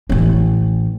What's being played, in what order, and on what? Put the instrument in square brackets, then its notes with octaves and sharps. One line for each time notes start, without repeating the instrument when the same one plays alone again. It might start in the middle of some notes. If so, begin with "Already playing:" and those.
[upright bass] A1 C#4